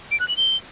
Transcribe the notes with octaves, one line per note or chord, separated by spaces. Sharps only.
D7
F#6
F#7
G7